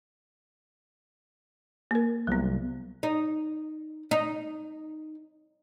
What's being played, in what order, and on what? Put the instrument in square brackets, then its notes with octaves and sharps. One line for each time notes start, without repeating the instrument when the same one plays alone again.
[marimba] A#3 A#4
[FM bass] C2 [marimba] F#3 B3
[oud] D#4
D#4